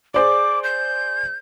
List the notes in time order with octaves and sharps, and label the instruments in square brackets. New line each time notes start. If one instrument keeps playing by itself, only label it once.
[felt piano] G#4 C5 D5 [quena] D6
[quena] G6